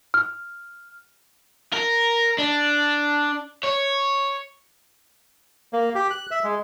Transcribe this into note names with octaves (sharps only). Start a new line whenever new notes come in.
F6
A#4
D4
C#5
A#3
G4
F#6
E5
G#3